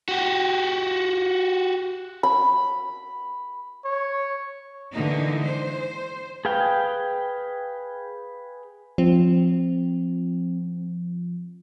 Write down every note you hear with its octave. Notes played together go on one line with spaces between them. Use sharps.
F#4 G4
B5
C#5
D3 E3 G#3 A#3 D#4
C5
G#4 B4 F5 G5
F3 C4